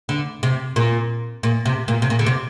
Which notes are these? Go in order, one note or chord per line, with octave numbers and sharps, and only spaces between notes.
D3
C3
A#2
A#2
C3
A#2
C3
A#2
D3
C3